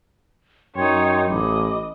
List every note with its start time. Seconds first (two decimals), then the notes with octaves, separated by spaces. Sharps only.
0.76 F#2 D#4 C#5 G5 C6 G#6
1.30 A1 D#5 B5 D6